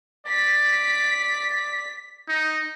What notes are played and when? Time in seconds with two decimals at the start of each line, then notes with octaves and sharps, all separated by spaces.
0.26 D5 B6
2.28 D#4